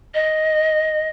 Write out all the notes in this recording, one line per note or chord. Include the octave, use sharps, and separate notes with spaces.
D#5